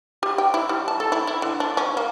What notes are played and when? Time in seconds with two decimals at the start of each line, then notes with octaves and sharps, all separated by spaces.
0.23 G4
0.38 G5
0.54 E4
0.69 G3
0.88 A5
1.00 A4
1.12 E4
1.27 E4
1.42 D3
1.60 D4
1.77 C#4
1.97 A#3